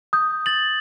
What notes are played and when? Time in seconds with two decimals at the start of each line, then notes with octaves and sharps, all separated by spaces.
0.13 D#6 G6
0.46 A6 F#7